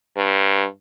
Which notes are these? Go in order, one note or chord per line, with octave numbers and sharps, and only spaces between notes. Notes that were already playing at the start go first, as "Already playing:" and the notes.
G2